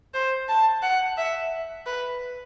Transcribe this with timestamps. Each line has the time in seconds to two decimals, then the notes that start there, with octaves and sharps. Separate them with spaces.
0.14 C5
0.49 A5
0.83 F#5
1.18 E5
1.87 B4